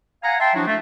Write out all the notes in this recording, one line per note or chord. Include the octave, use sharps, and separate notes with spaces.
F5 F#5 G#5 A#5
E5 G5 A5 C6
F3 F#3 D4 E4 F#4
A3